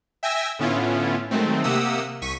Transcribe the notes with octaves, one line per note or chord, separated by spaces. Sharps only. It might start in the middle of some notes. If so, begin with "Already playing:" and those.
E5 G5 G#5 E6 A#6
A2 D3 B3 C#4 E4 F4
D#3 F#3 G#3 A3 C4
C3 A#3 G4 F#5 D#6 E6
C2 C#6 B6 D#7